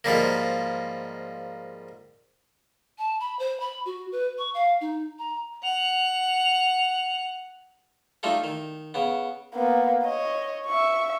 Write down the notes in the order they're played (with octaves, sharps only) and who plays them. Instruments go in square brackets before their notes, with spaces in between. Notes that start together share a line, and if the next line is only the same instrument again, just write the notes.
[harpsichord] G#2 F3 G3 A#3
[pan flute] A5
B5
C5
B5
F#4
B4
C#6
F5
D#4
A#5
[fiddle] F#5 [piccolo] F7
[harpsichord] G3 A3 D#4 F4 A4
D#3
C#3 B3
[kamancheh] A#3 B3
C#5 D#5
E5 C#6